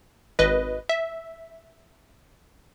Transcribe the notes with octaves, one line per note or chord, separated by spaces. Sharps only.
G#1 B4 D#5
E5